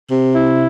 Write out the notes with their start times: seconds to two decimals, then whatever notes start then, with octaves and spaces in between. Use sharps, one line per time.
0.10 C3
0.35 E4